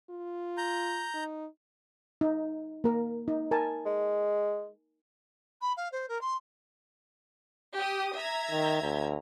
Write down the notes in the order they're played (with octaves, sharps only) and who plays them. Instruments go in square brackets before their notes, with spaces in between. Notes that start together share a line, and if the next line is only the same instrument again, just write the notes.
[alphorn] F4
[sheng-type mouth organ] A#5 G6
[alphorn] D#4
[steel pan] D#4
A#3 A#4
D#4
A#4 G#5 A5
[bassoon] G#3
[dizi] B5
F5
C5
A#4
C6
[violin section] G4 D#6
E5 A#5 G#6
[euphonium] D#3
D2